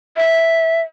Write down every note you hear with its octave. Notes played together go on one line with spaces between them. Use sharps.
E5